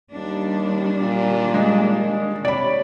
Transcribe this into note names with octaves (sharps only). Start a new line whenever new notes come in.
D#2 D#3 G3 D4
A#2
G#3
C3 C#5 D5 B5